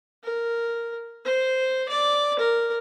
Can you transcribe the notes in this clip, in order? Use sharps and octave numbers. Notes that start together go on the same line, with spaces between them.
A#4
C5
D5
A#4